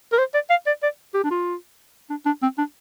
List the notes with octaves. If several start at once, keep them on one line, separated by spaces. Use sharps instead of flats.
A#4
C5
D5
F5
D5
D5
G4
D4
F4
D4
D4
C4
D4